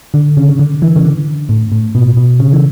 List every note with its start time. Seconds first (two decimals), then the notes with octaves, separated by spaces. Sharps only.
0.14 D3
0.37 C#3
0.49 C#3
0.59 D3
0.82 E3
0.96 C#3
1.05 D3
1.49 A2
1.72 A2
1.95 B2
2.17 B2
2.39 C#3
2.52 E3